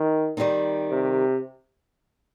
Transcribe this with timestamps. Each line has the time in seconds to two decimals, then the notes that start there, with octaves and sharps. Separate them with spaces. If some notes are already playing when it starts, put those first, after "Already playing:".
Already playing: D#3
0.37 D#3 G3 C4 D#4
0.91 C3